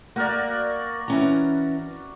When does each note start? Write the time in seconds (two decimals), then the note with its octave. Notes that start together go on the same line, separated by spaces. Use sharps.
0.16 A#3 F#4 A#4 D5
1.08 E3 C#4 A#5